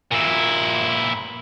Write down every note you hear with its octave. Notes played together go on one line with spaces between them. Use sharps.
A#2 E4